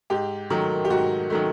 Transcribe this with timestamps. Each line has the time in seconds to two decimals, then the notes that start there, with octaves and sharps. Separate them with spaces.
0.10 G#2 G4
0.50 D#3 F#3 A3
0.85 G4
0.90 G#2 F#4
1.30 D#3 F#3 A3